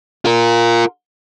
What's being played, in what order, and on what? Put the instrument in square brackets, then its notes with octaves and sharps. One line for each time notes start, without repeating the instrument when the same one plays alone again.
[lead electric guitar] F4 A#4